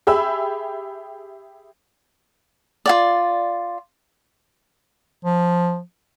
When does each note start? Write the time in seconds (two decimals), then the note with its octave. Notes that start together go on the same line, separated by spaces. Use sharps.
0.07 G4 G#4 E5 B5 E6
2.86 F4 F#4 D5
5.25 F3